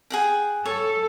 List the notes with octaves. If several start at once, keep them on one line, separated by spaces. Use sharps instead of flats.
G#4 F#5 G5
A4 C#5